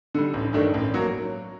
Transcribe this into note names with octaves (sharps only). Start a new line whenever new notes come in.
D3 G3
A1
G2 D#3 A3 D4
A1
F#3 A#3